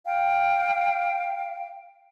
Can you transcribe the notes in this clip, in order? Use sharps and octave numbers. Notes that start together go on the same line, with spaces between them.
F5 G5